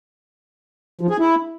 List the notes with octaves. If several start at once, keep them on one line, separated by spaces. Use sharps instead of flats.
F3
G#4
E4